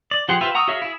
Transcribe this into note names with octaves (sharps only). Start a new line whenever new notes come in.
D5
F3 G4 G#4 F#5 C6
F4 G4 B4 C5 E5
F#5 A#5 C#6 D#6 E6
F#4 G#4 C#5 E5 F5
E4 G#4